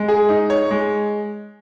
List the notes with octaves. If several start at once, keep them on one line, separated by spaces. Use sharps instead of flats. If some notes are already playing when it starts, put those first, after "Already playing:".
Already playing: G#3
G#4
D#4
C#5
G#3